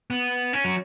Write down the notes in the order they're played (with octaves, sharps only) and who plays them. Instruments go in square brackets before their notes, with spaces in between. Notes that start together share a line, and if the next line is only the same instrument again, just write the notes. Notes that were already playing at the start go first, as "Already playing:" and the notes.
[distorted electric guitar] B3
C#4
F#3